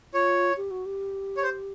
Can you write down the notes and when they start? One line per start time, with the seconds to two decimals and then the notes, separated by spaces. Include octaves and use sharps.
0.13 F4 C#5
0.57 G4
0.71 F#4
0.86 G4
1.37 C#5
1.43 C5